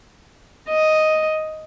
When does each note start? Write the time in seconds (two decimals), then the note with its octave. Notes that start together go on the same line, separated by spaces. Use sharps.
0.70 D#5